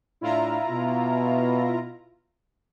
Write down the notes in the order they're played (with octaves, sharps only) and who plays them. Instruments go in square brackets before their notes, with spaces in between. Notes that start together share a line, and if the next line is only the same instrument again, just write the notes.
[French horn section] A2 D4 [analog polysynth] E4 F4 A#5
[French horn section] B2